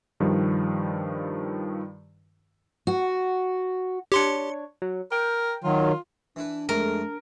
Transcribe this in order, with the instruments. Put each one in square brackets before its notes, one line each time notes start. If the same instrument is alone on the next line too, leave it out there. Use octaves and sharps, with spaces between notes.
[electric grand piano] G2 D#3 F3 G3
[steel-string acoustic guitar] F#4
[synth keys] D4 C#5 [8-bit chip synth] G4 C6 C#7
[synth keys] F#3
[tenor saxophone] A#4 [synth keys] G5
[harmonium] D#3 F#3 [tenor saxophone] F4
[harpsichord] E3 E4 B4 [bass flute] D4
[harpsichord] F2 G#3 A3 [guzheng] A#4